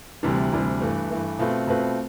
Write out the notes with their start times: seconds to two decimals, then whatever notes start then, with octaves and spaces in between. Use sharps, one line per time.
0.23 D2 C3 E3 G3 D4
0.52 D2 C3 E3 G3 D4
0.81 G2 E3 A3
1.10 G2 E3 A3
1.39 B2 A3 C4 F4 B4
1.67 B2 A3 C4 F4 B4